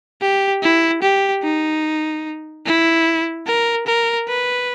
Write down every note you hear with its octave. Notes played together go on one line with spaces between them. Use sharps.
G4
E4
G4
D#4
E4
A#4
A#4
B4